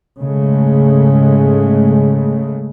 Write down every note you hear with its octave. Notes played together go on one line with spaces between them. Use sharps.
G#2 C#3 G#3 A3